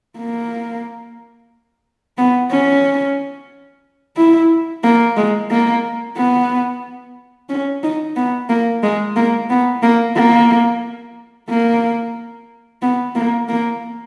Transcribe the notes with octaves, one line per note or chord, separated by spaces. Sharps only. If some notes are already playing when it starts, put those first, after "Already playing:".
A#3
B3
C#4
E4
A#3
G#3
A#3
B3
C#4
D#4
B3
A#3
G#3
A#3
B3
A#3
A#3
A#3
B3
A#3
A#3